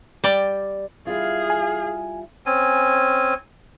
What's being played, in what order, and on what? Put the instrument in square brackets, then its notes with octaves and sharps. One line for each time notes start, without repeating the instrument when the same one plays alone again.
[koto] G3 D5 G5
[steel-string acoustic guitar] G3 E4 F4 [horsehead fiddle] G#4 F5
[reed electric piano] G#5
[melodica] C4 C#4 G#5